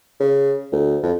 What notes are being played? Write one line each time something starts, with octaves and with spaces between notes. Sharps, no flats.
C#3
D2
F2